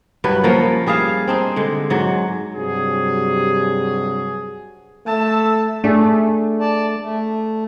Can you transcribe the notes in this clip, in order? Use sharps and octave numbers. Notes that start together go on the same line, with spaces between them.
G2 F#3 B4
F3 A#3 C#4
G3 G#4 E5 F5
C4 D4 D#4
D3 G#3
G#2 F#3
G2 C3 F#3 F#4 G#4
A3 A5 E6
A3 D4 G#4
D5 A5
A3